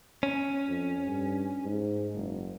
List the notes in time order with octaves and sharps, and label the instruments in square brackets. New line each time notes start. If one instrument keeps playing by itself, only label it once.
[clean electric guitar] C#4
[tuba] F2
G2
G#2
F#1